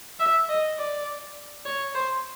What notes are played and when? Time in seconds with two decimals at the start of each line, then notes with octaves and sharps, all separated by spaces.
0.20 E5
0.49 D#5
0.78 D5
1.65 C#5
1.95 C5